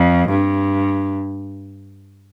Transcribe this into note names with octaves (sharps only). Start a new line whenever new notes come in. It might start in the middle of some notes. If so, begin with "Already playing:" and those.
Already playing: F2
G2